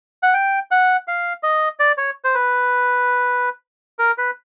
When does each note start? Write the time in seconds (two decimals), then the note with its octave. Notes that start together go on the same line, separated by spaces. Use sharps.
0.23 F#5
0.34 G5
0.71 F#5
1.08 F5
1.43 D#5
1.79 D5
1.98 C#5
2.24 C5
2.34 B4
3.99 A#4
4.18 B4